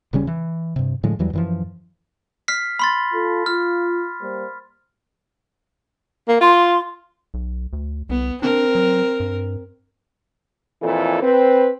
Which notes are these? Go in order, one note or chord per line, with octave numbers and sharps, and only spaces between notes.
D#1 C#3 G3 C#4
E3
G2 C3
A2 D3 F3 G#3
E2 E3 F#3 G3
F#2 E3 F3
F6 B6 C7
B5 C6 A6
F4 A4
F4 F6
G3 A#3 C5
A#3
F4 C6
B1
D2
C2 B3
C4 D4 A#4
F#3
G2
F2 A#2 E3 A4
C4 B4